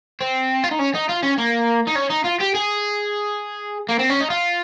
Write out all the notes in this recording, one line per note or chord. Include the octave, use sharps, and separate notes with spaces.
C4
F4
D#4
C#4
D#4
F4
C#4
A#3
D#4
C#4
D#4
F4
G4
G#4
A#3
C4
C#4
D#4
F4